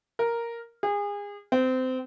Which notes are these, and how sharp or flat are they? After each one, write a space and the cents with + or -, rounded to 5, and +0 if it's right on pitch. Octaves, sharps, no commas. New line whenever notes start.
A#4 +0
G#4 -30
C4 -25